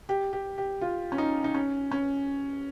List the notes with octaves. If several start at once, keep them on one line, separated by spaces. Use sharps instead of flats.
G4
G4
G4
F4
C#4
D#4
D#4
C#4
C#4